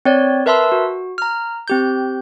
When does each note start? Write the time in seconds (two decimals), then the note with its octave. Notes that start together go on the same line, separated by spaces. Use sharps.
0.05 C4 C#5 D5
0.46 A#4 B4 E5 A5 C6 E6
0.72 F#4
1.18 A#5 F6
1.68 C4 G4 G6